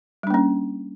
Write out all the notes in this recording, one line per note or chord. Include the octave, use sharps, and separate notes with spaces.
G3 A#3 C#4 D4